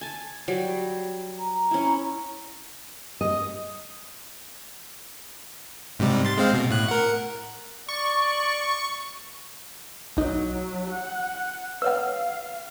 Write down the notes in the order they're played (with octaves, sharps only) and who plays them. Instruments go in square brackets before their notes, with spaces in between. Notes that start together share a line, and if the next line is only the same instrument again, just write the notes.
[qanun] G#5 A5
F#3 G3
[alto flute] A#5
[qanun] C#4 E4
[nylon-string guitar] D#5
[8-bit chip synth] G#2 C3 G3
C6 A6
G#3 C4 F5
B2
A2 F#6
A#4 F#5
[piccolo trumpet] D5 [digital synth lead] C#6
[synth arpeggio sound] B1 D#4 [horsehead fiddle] F#3
[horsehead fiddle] F#5
[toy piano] B4 C#5 F#5 [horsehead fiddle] F5 [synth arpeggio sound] E6